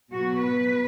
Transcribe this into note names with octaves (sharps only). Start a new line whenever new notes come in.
B2 F#3 B3 F#4
B4